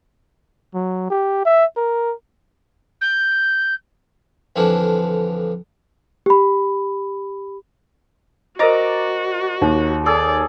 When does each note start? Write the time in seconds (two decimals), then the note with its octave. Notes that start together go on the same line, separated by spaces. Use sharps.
0.74 F#3
1.10 G4
1.45 E5
1.77 A#4
3.01 G6
4.56 F2 D3 E3 F3
6.26 G4 B5
8.59 F#4 A#4 C5 D5 D#5 A#5 D6
9.62 D#2
10.06 G#4 A4 D5 D#6